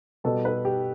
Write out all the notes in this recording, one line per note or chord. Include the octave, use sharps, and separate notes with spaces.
B2 G3 B3 A4
B4
G4